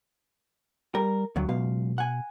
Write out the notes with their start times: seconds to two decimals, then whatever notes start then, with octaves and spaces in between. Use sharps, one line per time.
0.95 G3 A#4
1.36 D2 G2 F#3
1.49 C#2 F#2 B2 F5
1.98 F#5 G#5